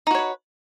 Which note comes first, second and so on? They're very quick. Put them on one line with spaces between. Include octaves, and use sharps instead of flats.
D#4 F#4 C#5 B4